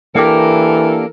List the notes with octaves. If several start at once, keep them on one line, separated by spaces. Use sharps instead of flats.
E3 A#3 D4 G4 A4 A#4